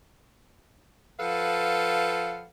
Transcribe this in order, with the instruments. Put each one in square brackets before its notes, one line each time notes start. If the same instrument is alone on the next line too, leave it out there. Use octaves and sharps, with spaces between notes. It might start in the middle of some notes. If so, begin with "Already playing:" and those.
[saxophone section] F3 A4 B4 F5 F#5